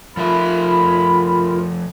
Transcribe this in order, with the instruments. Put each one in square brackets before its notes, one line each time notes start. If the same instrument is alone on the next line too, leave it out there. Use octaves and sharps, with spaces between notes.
[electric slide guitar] F3 A3 E5 [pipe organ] F4 A#4 [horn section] B5